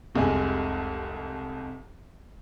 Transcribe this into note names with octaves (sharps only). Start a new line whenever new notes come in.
F1 C2 F2 G#3 G#5